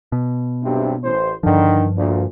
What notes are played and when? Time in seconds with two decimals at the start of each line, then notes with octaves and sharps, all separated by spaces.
0.12 B2
0.63 B1 G2 C3
1.03 A1 C5
1.43 G2 D3 D#3 F3
1.96 D2 A#2